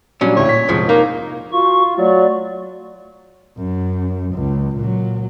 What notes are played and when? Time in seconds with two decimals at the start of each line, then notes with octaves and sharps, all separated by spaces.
0.21 A#2 F#3 G3 C#4 D4
0.36 D2 A2 E4 C#5
0.49 B6
0.69 F1 G#2 F3
0.89 A#3 D#4
1.52 F4 F#4 C#6
1.98 F#3 A3 D5
3.58 F#2
4.35 C#2
4.77 A#2 F#3